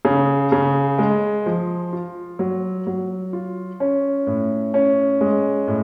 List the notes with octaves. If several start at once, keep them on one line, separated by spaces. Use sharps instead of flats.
C#3
C#3
G#3
F3
F4
F#3
F#3
F4
C#4
A2
C#4
G#3
A2